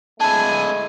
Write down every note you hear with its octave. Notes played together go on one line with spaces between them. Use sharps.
G#3 A3 D4 E4 G#5 A5